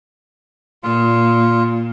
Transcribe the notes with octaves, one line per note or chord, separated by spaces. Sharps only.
A#2 F4